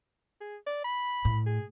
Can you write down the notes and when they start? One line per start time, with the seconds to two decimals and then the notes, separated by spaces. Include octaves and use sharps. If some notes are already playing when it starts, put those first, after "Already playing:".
0.41 G#4
0.66 D5
0.84 B5
1.25 A2
1.46 G#4